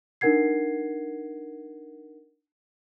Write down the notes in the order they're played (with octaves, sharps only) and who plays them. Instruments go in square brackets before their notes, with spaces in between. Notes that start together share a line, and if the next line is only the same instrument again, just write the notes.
[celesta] D4 D#4 A#4 F#5 G#6 C7